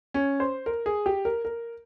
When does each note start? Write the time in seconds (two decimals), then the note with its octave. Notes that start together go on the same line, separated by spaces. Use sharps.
0.14 C#4
0.40 C5
0.66 A#4
0.86 G#4
1.06 G4
1.25 A#4
1.45 A#4